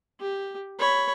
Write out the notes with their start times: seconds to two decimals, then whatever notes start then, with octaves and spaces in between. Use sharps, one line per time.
0.20 G4
0.79 C#5 B5